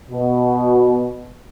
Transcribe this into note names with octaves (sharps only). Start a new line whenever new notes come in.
B2